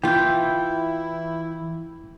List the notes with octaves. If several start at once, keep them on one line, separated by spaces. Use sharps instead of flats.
E3 E4 F4 G5 G6